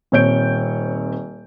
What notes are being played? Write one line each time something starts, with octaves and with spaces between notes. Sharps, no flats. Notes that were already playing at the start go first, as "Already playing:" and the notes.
D#1 C4 C#5 G6 D7